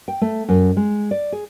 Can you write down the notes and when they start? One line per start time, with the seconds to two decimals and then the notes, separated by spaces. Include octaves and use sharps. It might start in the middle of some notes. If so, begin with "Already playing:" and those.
0.08 G5
0.21 A3
0.49 F#2
0.77 G#3
1.11 D5
1.32 G#4